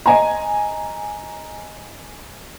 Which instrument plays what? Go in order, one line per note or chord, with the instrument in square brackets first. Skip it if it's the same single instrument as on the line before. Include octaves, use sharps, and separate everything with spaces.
[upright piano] D#5 G#5 A#5